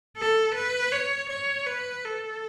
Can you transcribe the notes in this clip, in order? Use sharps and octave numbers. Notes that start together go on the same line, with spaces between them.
A4
B4
C#5
C#5
B4
A4